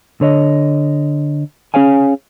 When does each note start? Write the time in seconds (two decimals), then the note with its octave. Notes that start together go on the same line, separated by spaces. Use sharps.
0.21 D3 C#5 D#5
1.74 C#4 G#4 C#5 F5 G#5